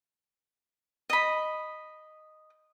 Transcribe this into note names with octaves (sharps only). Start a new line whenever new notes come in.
D#5 B5